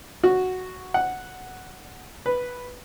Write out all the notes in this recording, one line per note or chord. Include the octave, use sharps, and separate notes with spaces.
F#4
F#5
B4